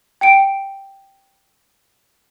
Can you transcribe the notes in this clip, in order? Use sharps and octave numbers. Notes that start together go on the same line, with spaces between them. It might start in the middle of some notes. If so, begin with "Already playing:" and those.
G5 C#7 D7